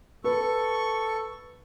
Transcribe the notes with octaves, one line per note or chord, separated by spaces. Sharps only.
A4 B4 C#6